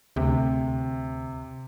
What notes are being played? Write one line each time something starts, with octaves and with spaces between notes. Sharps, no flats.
D2 C3